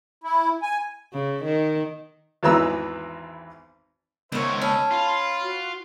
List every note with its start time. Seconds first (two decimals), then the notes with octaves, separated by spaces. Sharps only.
0.24 E4
0.62 G#5
1.13 C#3
1.44 D#3
2.43 G#1 E2 E3 B4 A#5 E6
4.32 C#2 D#3 B3 C5 C#5 E5
4.62 C#4 D#5 A5 B5 E6
4.91 F4 B5 C6
5.42 F#4